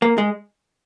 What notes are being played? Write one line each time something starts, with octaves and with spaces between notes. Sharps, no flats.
A#3
G#3